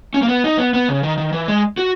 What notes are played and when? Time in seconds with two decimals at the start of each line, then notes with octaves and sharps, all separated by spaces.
0.14 C#4
0.22 A#3
0.28 B3
0.44 D#4
0.58 B3
0.74 B3
0.89 C#3
1.03 D#3
1.18 D#3
1.33 E3
1.48 G#3
1.78 F#4